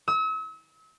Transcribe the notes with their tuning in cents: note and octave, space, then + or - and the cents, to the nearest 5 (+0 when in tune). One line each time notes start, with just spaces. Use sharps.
E6 -40